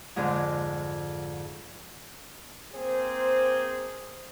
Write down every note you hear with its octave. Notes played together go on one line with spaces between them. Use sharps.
F2 G#2 D3 G#3
A#3 C4 G#4 C5